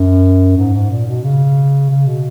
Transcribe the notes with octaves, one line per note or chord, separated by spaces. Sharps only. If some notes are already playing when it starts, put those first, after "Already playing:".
Already playing: F#2
G#2
G#2
A#2
B2
C#3
C#3
B2